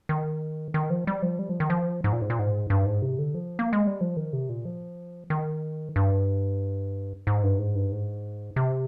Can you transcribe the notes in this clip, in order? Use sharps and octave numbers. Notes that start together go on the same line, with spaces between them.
D#3
D#3
F3
G3
F3
G3
F3
D#3
F3
G#2
A#2
G#2
A#2
G#2
G2
G#2
C3
D3
F3
A#3
G#3
G3
F3
D#3
C3
A#2
F3
D#3
G2
G#2
G2
G#2
G2
G#2
C3